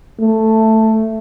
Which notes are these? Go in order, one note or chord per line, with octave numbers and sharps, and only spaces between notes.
A3